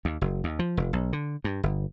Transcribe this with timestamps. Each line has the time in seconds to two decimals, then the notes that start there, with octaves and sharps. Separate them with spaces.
0.05 D#2
0.21 F#1
0.44 D#2
0.59 F3
0.77 F1
0.93 B1
1.13 D3
1.44 G2
1.63 G1